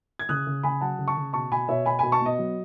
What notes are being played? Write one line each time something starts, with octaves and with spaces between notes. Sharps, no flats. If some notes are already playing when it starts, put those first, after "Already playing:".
G#6
C#3 D#6 F#6
C#3
C#3 G#5 B5
F#3 F#5 A5
C#3
A5 C#6
C#3
B2 A5 C#6
B2 G#5 B5
B2 C#5 E5
B2 G#5 B5
B2 G#5 B5
A5 C#6
B3 D#5
F#3